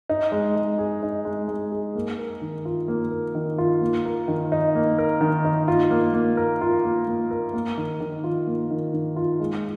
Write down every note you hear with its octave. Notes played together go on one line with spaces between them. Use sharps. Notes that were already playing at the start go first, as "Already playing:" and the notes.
D#4
G#3
G#3
G#4
D#4
G#3
G#3
G#4
A#3
A#4
D#3
F4
A#3
A#4
D#3
F4
A#3
A#4
D#3
D#4
A#3
A#4
D#3
D#4
F4
A#3
A#3
A#4
F4
A#3
A#3
A#4
A#3
D#3
D#3
F4
A#3
D#3
D#3
F4
G#3